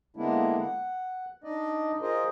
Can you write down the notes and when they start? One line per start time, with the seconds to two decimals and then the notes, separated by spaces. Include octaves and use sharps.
0.17 D3 G#3 A#3 B3 D4 E4
0.60 F#5
1.44 D4 D#4 D5 D#5
2.02 F4 G#4 A#4 C5 D#5